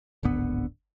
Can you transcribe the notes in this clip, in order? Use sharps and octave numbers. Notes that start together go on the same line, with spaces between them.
D1 G#1 D3 B3